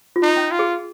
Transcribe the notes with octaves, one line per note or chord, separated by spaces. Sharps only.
F4
D#4
C#4
F4
G#4